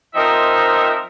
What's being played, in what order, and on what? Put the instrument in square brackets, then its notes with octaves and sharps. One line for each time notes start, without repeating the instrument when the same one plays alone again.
[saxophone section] F3 C4 D#4 A#4 D#5 E5